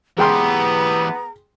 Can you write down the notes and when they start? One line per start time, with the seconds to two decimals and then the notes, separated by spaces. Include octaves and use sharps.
0.18 E3 G#3 B3 G4 G5 A#5 C6